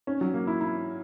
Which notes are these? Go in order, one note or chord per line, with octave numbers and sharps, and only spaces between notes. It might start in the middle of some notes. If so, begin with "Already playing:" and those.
C#4
F#3
A#3
E4
E4